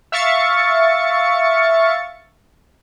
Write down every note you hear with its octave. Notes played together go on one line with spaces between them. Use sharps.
E5 F5 C#6 A6 C#7